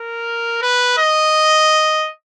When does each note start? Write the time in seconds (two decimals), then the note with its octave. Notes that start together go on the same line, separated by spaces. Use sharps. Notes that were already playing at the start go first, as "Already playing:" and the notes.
Already playing: A#4
0.62 B4
0.98 D#5